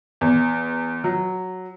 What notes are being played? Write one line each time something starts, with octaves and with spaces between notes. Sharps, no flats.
E2
F#3